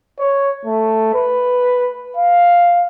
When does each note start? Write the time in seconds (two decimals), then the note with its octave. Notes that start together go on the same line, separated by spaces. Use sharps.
0.19 C#5
0.65 A3
1.14 B4
2.17 F5